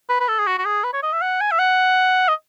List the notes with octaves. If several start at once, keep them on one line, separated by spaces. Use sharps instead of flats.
B4
B4
A4
G#4
F#4
F#4
G#4
B4
C#5
D#5
E5
F#5
G#5
E5
F#5
D#5